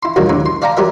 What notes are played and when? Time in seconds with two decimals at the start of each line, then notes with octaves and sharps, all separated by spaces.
0.03 E4 C6
0.16 D2 A#2 D#3 F#3 G3
0.29 C#2 A2 D3
0.46 C6
0.62 D5 F5 G5 A5 A#5
0.77 F#3 G3 G4 A#4 E5